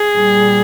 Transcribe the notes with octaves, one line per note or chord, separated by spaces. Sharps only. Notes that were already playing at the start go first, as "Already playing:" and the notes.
Already playing: G#4
A#2 G3